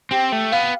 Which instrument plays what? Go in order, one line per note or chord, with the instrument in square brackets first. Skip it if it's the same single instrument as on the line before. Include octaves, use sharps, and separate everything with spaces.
[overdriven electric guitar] C4 [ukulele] G4
[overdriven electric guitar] A3
[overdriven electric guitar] B3 [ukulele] F5